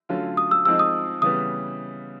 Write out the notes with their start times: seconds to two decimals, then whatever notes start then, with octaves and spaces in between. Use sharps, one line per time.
0.09 D3 F#3 A3 C#4 F4
0.37 D#6
0.51 E6
0.65 F3 G#3 C4 D#4 E6
0.79 D#6
1.22 C#3 E3 G3 B3 D#6